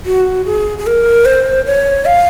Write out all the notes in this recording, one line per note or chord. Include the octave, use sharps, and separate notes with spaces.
F#4
G#4
G#4
A#4
C5
C#5
F5